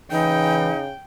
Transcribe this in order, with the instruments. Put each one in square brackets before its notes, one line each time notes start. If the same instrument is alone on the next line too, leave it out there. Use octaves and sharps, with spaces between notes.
[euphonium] C#3 [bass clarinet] E3 [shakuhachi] D#4 [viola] G5